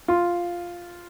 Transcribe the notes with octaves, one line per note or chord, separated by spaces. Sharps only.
F4